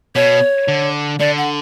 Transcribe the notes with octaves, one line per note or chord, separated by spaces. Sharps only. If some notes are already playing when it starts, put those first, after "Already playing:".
B2 C#5
D3
D3 D5
F#5